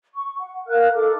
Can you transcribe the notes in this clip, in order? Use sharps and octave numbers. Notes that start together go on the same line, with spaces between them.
C#6
F#5
A#4 F5 F6 F#6
D#4 A4 D6